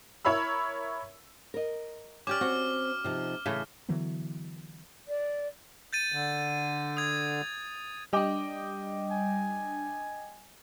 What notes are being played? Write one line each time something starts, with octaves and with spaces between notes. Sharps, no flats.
E4 A#4 C#5 E5 B5 E6
A#4 D#5
C#4 G4 D5 D6 F6
C4 F#4
C3 F3 D#4
A2 C#3 E3 A3
D3 E3 F#3 B3
D5
G6 A6 D#7
D3
D#6 G#6
G3 D4 D#5 G5 D6
G#5